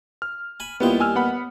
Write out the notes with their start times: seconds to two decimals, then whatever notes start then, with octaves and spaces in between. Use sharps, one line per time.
0.22 F6
0.60 G#5 B5
0.80 D#2 G3 B3 E4 F4 G5
1.00 G#5 E6 F6
1.15 B3 F#5 B5